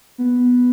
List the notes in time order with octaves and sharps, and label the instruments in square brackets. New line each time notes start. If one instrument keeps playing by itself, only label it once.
[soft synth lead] B3